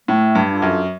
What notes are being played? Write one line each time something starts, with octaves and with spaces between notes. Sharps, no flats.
A2 A3
G2
D4 F4 A4
F#2